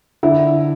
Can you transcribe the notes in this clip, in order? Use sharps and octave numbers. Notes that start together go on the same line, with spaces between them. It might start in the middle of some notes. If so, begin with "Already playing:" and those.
D3 E4